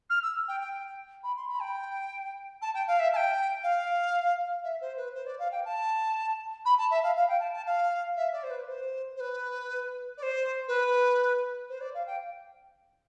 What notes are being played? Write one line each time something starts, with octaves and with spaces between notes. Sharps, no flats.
F6
E6
G5
G5
B5
C6
B5
G5
A5
G5
F5
E5
A5
G5
F5
E5
C5
B4
C5
D5
F5
G5
A5
B5
A5
E5
F5
F5
G5
A5
A5
F5
E5
D5
C5
B4
C5
C5
B4
D5
C5
B4
C5
D5
F5
G5